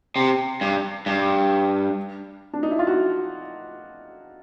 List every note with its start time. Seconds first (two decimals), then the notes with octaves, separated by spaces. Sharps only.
0.16 C3
0.61 G2
1.06 G2
2.53 D4
2.63 D#4
2.71 E4
2.79 F4
2.87 F#4